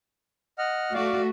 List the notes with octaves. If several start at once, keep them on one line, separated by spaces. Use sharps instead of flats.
D#5 F#5 F6
A3 F#4 D5 F5